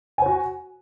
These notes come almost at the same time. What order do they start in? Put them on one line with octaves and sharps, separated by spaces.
G#5 C5 F#4